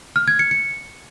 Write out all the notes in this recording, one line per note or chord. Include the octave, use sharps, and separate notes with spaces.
F6
G#6
C#7
C#7